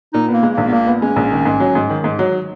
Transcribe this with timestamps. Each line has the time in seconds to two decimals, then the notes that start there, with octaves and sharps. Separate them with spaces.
0.13 A#2 D#4
0.28 B3
0.34 A#3
0.43 G#3
0.53 A#1 A#3
0.68 B3
0.72 A#2 A#3
0.87 B3
1.02 G#3 C#4
1.16 A#1
1.32 D#3
1.45 G#2
1.60 F#3
1.75 G#2
1.90 D#3
2.04 G#2
2.19 F#3